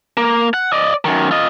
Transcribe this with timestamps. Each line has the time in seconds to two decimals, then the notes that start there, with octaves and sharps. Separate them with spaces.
0.17 A#3
0.54 F#5
0.72 D5 D#5
1.05 F#2 D#3
1.31 F4 D#5